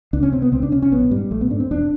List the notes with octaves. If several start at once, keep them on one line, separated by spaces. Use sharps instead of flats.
C#2 D4
C#4
C3 C4
B3
C#2 C4
D4
C3 C#4
C#4
A#1 B3
G#2 G3
A#1 A3
B3
G#2 D4
C4
E1 D4